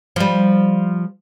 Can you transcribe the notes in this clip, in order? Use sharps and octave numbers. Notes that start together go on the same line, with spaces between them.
F3 G3